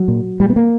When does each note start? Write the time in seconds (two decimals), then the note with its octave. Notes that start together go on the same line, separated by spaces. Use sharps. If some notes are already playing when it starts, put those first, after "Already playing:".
Already playing: F#3
0.08 A#2
0.40 A#2 G3
0.50 B3
0.56 A#3